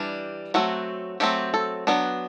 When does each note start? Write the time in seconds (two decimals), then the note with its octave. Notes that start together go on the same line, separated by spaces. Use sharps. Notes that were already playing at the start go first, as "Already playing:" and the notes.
Already playing: E3 G3 D4
0.54 F#3 A3 C4 F#4
1.20 F#3 A3 C4 G4
1.54 A4
1.87 F#3 B3 D4